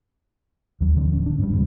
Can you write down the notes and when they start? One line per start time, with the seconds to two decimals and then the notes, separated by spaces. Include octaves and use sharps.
0.81 D#2 F#3
0.96 D3 F3 C4 D4
1.12 D1 C#4
1.26 D4
1.39 G#2 F#3 G3
1.51 F#1 E2 C3